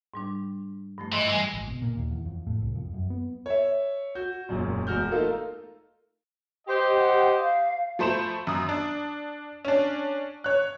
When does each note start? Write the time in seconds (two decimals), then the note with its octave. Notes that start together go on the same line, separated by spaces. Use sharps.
0.14 G#2 G3 D4
0.98 G2 F3 A3
1.12 G#2 E3 D#5 C6
1.29 E3 G3 G#3
1.53 G#1
1.67 B2
1.82 A#2
1.96 D#2
2.10 E2
2.25 F2
2.47 A2
2.62 C2
2.75 F2
2.94 F#2
3.10 B3
3.46 C#5 E5
4.15 F#4 G6
4.49 E1 F#2 A#2
4.87 E1 G#3 F#4 F6 G6
5.11 A3 A#3 D#4 F4 A4 A#4
6.67 G4 C5 D#5
6.97 F#5
7.37 F5
7.99 F3 A3 C5 B5 E7
8.47 F#2 D#6
8.69 D4
9.65 C#4 D4
10.44 C#5 F#6